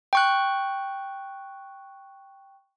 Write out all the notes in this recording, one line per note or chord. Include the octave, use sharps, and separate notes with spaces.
G5 C#6 F#6